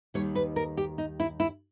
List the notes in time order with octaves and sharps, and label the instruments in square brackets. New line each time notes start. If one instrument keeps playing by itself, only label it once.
[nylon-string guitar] D#2 D#3 G3 C#5
B4
A#4
G4
D#4
E4
E4